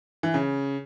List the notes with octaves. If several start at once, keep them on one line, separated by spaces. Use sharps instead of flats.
E3
C#3